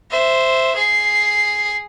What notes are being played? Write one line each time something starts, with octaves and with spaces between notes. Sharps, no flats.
C5 E5
G#4 C7